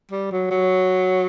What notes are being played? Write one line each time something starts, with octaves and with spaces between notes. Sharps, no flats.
G3
F#3
F#3